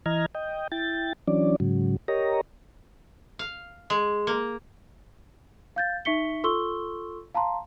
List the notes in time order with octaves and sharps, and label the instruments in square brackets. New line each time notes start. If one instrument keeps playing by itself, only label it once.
[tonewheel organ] E3 D#5 A#5 F6 G#6
D#5 G5
E4 G5 A6
E3 F#3 C#4 D4 D5
G#2 C#3 F#3
G4 A#4 C#5 D#5 A#5
[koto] F5
G#3
A#3
[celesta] F5 G6 A6
D#4 E5 C#6 B6 C#7 G7
F4 A4 C6 C#6 E6 G7
F5 A5 A#5 C6